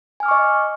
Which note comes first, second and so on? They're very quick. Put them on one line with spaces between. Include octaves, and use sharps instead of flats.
G#5 F6 D6 C#6 D#5